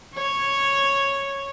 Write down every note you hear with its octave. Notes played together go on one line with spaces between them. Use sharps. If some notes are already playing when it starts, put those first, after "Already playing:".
C#5